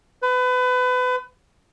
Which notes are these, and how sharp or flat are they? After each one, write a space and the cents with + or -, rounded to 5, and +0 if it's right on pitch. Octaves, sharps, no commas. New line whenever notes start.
B4 +30